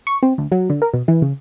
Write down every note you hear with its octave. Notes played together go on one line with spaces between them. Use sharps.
C#6
C4
D2
F#3
D3
A#4
B2
E3
C#3